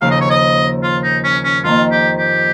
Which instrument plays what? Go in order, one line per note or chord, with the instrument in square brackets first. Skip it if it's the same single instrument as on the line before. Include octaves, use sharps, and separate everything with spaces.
[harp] D#2 C#3 F3 [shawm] F5
[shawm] D#5
C#5
D#5
F4
D#4
C#4
C#4
[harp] F2 D#3 A#3 [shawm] F4
[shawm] G4
G4